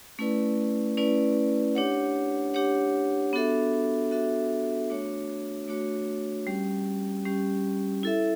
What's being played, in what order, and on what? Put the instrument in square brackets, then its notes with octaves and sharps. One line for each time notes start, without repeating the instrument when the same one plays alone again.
[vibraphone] A3 C#4 E4 B4 D5
A3 C#4 E4 B4 D5
D4 G4 C#5 F#5
D4 G4 C#5 F#5
B3 D4 F#4 A4 E5
B3 D4 F#4 A4 E5
A3 D4 F#4 C#5
A3 D4 F#4 C#5
G3 C#4 G4
G3 C#4 G4
E4 A4 E5